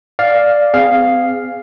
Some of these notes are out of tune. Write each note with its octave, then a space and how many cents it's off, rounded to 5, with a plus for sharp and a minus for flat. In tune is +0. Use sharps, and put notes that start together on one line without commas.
D5 +0 F5 +5
C4 -35 G#4 -5 F5 +0